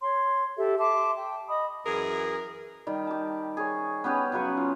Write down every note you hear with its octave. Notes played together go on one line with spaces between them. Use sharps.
C#5 C6
G4 A4 E5
E5 A5 C6 D6
G5
D#5 B5 D#6
F#2 E3 G#4 A#4
D#3 G3
G4 A5
G#4 C#5
B3 C#4 G4 B4
C#3 F#3 B4 C#6
F4